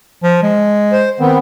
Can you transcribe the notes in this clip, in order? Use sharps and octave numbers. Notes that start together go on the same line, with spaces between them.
F3
G#3
C5
D#3 B3 C4